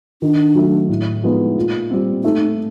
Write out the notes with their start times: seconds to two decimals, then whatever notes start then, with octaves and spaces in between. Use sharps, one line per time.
0.22 D#3 D4
0.55 F#3 A3
0.89 A2
1.23 F3 G#3 B3 D#4
1.57 A#2
1.91 G3 C4
2.24 A3 D#4